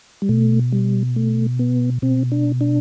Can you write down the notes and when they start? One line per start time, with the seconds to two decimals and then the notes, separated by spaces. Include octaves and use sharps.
0.22 G3
0.29 B2 A3
0.72 G3
1.16 A3
1.59 B3
2.02 B2 C4
2.32 D4
2.61 D4